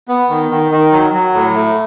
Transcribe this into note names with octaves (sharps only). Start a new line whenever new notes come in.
B3
D#3
D#3
D#3
F#3
F#3
A2
A3